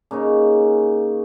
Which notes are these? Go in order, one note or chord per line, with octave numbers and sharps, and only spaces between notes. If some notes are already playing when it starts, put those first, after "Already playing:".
C#3 A#3 C#4 D#4